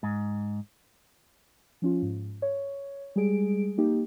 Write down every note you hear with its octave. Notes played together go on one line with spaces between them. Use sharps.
G#2
F3 C#4 F4
G#2
C#5
G3 G#3 G#4 D7
A#3 D#4 G4